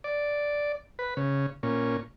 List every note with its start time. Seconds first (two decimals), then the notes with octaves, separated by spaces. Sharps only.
0.04 D5
0.99 B4
1.17 C#3
1.63 A#2 C#4